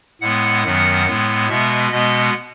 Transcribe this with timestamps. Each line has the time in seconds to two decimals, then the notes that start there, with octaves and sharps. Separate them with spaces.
0.21 A2 G#3 B3 F#5
0.64 F#2 D#3 F#3 B3
1.07 A2 G#3 B3
1.49 B2 G#3 B3 E5
1.92 B2 G#3 B3 D#5